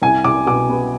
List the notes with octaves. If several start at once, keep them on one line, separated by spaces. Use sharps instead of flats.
C2 G#5
C2 D6
B2 D6
B3